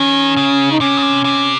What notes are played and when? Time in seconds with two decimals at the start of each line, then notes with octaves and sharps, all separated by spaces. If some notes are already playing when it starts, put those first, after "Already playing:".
Already playing: D#3 C#4
0.37 C#3
0.72 D#4
0.81 C3 C#4
0.97 C#3
1.02 C3
1.25 C3